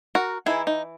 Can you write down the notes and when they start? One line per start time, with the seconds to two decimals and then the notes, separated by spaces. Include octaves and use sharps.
0.15 F#4 A#4
0.46 E3 A#3 D#4 E4 G#4
0.67 D#4